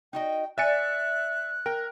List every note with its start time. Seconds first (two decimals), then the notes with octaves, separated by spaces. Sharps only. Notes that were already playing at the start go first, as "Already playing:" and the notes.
0.13 D#4 F#4 D#5 G5
0.58 D5 E5 G#5 F#6 A6 C#7
1.66 A#4 G5